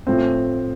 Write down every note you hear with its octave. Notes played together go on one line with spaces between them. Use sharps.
A2 F3 A3 C4